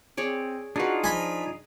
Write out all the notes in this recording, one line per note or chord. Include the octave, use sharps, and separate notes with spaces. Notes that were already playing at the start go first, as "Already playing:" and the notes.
C4 G#4 C#5 D5
D4 D#4 F4 F#4 G#4 B4
F3 D#5 G#5 B5